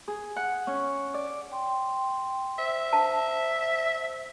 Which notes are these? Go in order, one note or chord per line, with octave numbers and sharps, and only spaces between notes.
G#4
F#5
C#4
D5
G5 C6
C5 E5
A5